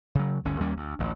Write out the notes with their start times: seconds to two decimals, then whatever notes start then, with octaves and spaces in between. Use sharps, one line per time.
0.15 C#3 F#3
0.45 G1 D2 C#4
0.60 D#2 G3 A#3 C#4
0.77 D2
0.99 A1 D2